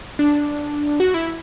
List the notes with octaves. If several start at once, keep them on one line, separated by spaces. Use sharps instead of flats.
D4
F#4
E4